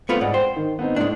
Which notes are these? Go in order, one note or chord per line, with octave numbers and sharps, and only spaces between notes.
A3 B3 C4 F4
G#2 D5 F#5
C5 G5
D#3
B3 C4 D#4
A2 G#3 D4